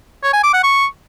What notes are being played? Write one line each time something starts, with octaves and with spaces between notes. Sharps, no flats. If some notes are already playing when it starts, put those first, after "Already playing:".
C#5
G#5
D6
F#5
C#6